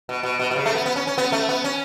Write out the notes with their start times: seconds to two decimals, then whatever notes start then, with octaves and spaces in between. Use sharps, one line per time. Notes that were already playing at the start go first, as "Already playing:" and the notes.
0.09 B2
0.23 B2
0.40 B2
0.51 B2
0.56 C#3
0.66 A3
0.75 B3
0.86 B3
0.96 C#4
1.07 C#4
1.18 B3
1.32 A3
1.49 B3
1.64 C#4